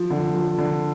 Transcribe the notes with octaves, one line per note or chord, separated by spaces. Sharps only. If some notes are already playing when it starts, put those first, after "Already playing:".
Already playing: F3
D3
F3
D3